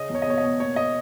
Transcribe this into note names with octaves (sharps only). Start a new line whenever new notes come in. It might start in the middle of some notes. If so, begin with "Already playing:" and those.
Already playing: C#3 C#4 D#5
E2
C#5
D#5
B2 C#5
B2 D#5
A#3 C#5
B2 D#5